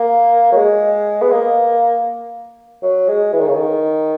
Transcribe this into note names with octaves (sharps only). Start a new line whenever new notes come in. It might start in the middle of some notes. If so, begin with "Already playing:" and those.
Already playing: A#3
F#3
G#3
B3
A#3
F#3
G#3
E3
D#3
C#3
D#3